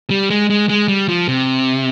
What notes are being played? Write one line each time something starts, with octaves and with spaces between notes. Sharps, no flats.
G3
G#3
G#3
G#3
G3
F3
C3